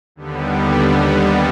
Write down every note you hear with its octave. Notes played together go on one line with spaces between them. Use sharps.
D#2 D3 G3 B3